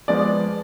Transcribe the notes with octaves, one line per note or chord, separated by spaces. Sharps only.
F3 G#3 B3 D5